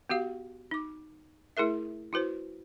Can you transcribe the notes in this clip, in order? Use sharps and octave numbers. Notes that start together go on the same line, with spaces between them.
B3 F#4 G4 F5
D#4 D6
A3 E4 G#4 A#4 E5
E4 F#4 B4 C5